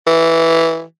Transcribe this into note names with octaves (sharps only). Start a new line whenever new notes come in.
E3